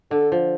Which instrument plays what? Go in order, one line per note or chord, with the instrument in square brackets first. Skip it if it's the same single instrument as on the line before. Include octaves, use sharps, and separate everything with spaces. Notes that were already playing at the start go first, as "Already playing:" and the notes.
[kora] D3 [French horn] A4
[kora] F3